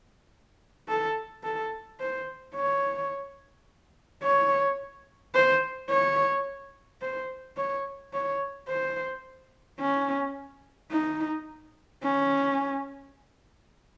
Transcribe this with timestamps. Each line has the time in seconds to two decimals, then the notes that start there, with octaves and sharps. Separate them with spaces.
0.88 A4
1.43 A4
2.00 C5
2.55 C#5
4.23 C#5
5.35 C5
5.90 C#5
7.02 C5
7.57 C#5
8.13 C#5
8.68 C5
9.80 C#4
10.92 D#4
12.03 C#4